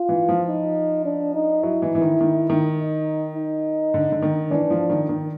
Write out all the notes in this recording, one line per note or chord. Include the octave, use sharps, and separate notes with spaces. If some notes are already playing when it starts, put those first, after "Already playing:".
Already playing: F4
E3
F3
D#4
D4
D#4
F#3 E4
E3
E3
D#3
D#3
D#3
D#4
D#4
D3
D3
D#3
E3 D4
F3
D#3
D#3